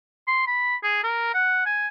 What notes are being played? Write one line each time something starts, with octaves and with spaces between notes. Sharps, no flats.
C6
B5
G#4
A#4
F#5
G#5